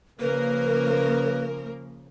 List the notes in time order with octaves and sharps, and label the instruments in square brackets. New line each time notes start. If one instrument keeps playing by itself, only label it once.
[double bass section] C#3 F3 [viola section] A#3 A#4 [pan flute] B4